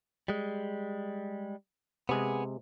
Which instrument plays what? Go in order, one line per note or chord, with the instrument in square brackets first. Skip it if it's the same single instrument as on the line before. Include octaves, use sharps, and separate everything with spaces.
[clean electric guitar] G3 G#3
[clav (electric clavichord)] C3 G#3 [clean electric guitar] B3 G#4